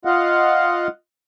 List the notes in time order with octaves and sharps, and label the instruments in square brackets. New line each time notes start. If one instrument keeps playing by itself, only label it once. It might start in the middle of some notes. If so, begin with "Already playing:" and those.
[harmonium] F4 D#5 F5 F#5